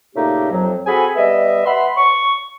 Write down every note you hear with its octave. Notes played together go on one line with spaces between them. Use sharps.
A#2 C#3 A3 A#3 D#4 G4
F2 F#3
C4 F#4 G#4 A4 G#5 B5
G3 B3 D#5 E5
B4 E5 F#5 B5 C6
C#6